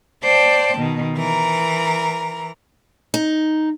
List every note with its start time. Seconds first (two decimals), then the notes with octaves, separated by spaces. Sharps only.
0.24 C5 D5 G5 A5
0.77 B2 D#3
1.15 E3 A#4 A#5
3.14 D#4